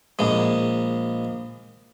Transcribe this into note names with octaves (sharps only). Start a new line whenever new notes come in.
A#1 G#3